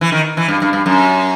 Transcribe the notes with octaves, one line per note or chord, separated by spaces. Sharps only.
E3
D#3
E3
G2
G2
G2
F#2